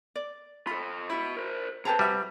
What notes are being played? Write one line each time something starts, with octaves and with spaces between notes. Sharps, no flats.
D5
F4 A4 B5
E4 F#4 B5
A#4 C5
C3 G#4 A4 B4 G5 A5 A#5
G3 F#4 E5